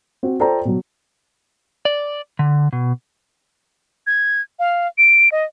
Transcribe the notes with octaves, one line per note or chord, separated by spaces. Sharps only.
C4 F#4
F4 A4 C5 D5 G5 A#5
B2 F#3
D5
D3
B2
G#6
F5
D7
D#5